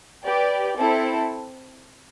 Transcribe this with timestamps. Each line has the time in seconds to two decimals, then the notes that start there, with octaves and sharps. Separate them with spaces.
0.25 G4 B4 D5 G5
0.76 C4 E4 A4